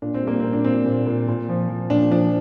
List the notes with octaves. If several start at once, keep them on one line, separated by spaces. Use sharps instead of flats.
A#2 D4
C4
G3 A#3
C4
A#2
D4
A#2 C4
A#2
A#2
A#2
F3
F3
A#2 D4
F3 D4